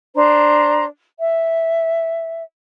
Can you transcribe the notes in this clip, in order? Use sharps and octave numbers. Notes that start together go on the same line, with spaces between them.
D4 C5 A#5
E5